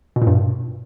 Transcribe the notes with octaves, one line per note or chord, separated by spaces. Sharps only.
B2
A#2
G2